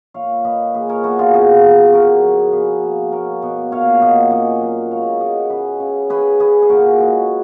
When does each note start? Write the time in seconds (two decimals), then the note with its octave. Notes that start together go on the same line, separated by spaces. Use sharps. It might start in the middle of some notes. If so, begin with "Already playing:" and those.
0.14 A#2 C#5 F5
0.40 A#2 B4 D#5 F5
0.74 A#2 G#4 B4
0.89 A#4 C#5
1.04 B3 F#4 A#4
1.19 F4 G#4
1.34 C#3 F4 G#4
1.64 F3
1.93 C#3 F#4 A#4
2.23 F3
2.52 B2 G#4 B4
2.83 A#3
3.12 A#3 A#4 C#5
3.42 B2
3.71 A#2 C#5 F5
4.02 A#2 D#5 F#5
4.31 C#4 D#5 F#5
4.61 F#3
4.91 G#3 C#5 F5
5.21 G#3 D#5 F#5
5.50 C#3 G#4 B4
5.80 C#3
6.10 C#4 G#4 B4
6.40 C#4 G#4 B4
6.62 G#4
6.69 A#2 F#4 A#4
6.99 G#3 G#4 B4